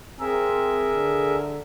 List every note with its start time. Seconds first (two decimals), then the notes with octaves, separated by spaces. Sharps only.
0.20 C4 G#4 A#4 E5
0.90 D3